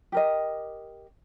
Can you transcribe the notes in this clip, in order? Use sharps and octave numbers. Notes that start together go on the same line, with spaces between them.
G4 A#4 D#5